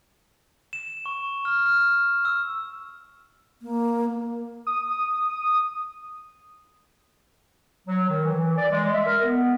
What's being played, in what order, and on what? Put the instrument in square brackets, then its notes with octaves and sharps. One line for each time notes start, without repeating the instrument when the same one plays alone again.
[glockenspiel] E7
C#6
F6
F6
E6
[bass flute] A#3
[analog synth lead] D#6
[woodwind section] F#3
D#3
E3
D5
G#3
E5
A#4
B3